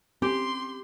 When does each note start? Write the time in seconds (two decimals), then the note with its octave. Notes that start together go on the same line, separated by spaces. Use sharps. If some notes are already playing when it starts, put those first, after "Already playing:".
0.22 C4 C#4 G4 C6